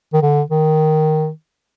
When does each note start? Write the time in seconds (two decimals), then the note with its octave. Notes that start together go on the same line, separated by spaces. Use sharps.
0.13 D#3
0.22 D3
0.50 D#3